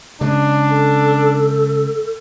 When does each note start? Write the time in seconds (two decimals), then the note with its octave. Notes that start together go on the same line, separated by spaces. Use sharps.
0.21 C#3 G#3 D4
0.70 A4